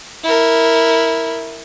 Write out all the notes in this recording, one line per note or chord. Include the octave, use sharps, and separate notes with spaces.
E4 A#4